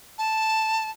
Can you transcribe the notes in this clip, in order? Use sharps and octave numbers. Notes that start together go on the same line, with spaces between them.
A5